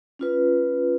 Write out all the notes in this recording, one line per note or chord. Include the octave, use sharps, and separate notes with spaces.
C#4 F4 B4